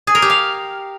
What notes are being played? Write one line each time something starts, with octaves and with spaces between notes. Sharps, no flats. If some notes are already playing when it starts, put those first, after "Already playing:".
G#4
A#4
G4
F5